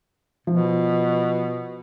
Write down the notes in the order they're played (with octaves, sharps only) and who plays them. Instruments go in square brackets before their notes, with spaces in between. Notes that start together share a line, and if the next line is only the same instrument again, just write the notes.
[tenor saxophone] B2 [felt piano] F3